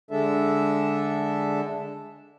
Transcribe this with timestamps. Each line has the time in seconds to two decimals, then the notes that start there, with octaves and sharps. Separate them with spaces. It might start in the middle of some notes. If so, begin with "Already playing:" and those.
0.11 D3 G#3 D4 A4 E5